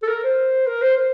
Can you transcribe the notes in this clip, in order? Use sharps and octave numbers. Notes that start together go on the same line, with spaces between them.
A4
A#4
C5
A#4
C5
C5